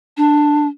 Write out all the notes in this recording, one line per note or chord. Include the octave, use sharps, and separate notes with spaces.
D4